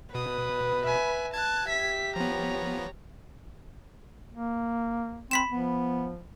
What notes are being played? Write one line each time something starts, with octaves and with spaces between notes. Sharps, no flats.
B2 B4 D#6
E5 G#5
A5 F#6 G#6
G4 E5 B6
F3 B3 C#5 A#5
A#3
C4 B5 B6 E7
F3 B3